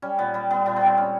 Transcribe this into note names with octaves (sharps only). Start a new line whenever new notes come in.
G3 C#4
A#2 B3
G3 B3
G3 B3
A#2 B3
G3 B3
C4
G#3 C#4